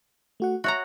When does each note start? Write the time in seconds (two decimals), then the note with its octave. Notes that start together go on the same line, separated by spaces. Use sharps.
0.40 A3 F#4 F#5
0.64 F#4 C#5 E5 A#5